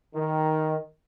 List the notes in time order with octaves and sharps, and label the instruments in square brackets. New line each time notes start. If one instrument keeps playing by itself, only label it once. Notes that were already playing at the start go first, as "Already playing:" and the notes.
[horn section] D#3